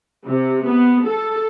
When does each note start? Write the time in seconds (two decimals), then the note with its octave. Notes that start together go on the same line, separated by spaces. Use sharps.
0.24 C3
0.65 B3
1.04 A4